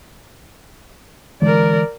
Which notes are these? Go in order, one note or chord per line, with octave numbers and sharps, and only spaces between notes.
D3 E3 G#3 A#4 D5